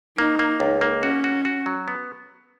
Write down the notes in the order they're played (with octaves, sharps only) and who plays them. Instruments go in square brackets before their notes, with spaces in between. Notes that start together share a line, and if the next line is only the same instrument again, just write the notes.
[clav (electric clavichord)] A#3 [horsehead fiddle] D#4
[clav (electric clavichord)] A#3
C#2
A#3
[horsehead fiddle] C#4 [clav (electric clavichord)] F#4
[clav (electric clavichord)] F#4
F#4
F#3
B3